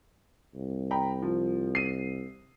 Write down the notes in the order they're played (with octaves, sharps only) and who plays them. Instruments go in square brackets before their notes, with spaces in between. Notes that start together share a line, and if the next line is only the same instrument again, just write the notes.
[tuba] C2
[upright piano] G5 A#5 B5
F3
C7 D#7